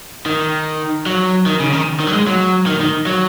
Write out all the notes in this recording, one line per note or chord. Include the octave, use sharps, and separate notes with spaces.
D#3
F#3
D#3
C#3
D#3
D#3
F#3
G#3
F#3
D#3
D#3
F#3